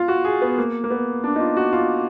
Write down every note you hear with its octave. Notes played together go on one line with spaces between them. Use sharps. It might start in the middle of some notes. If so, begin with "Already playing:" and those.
Already playing: F4
F#4
G#4
B3
A#3
A#3
B3
D4
D#4
F4
F#4
F4